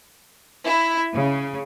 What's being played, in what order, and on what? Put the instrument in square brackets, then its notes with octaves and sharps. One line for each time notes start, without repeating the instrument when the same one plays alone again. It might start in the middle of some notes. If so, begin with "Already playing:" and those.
[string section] E4
C#3